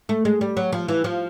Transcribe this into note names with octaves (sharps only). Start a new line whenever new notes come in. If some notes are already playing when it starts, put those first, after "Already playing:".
A3
G#3
G3
F#3
F3
E3
F3